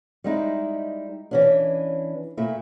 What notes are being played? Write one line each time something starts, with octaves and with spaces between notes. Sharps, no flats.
G3 G#3 D#4 E4
E3 C#4 D4
A#2 A3 E4